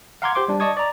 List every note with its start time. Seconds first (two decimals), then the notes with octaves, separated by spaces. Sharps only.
0.22 F5 F#5 A#5 C6 D6 G#6
0.35 G4 C5 C6 D6
0.48 G3 D4
0.60 D5 D#5 A5 C#6 D#6 G#6
0.77 D5 A#5